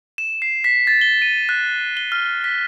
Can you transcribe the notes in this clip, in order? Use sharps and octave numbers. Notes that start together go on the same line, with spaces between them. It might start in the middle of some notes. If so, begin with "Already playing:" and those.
E7
C7
B6
A6
G7
D#7
F#6
G7
F6
B6